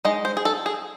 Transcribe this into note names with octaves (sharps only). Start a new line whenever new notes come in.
G#3 D#4 D#5
C5
G#4
A4
G#4